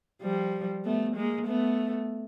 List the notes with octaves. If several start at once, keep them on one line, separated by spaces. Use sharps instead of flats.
F3 G3
A3 B3
G#3 A#3
A3 B3